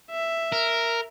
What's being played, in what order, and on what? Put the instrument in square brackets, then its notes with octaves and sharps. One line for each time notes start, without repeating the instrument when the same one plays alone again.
[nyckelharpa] E5
[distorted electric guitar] A#4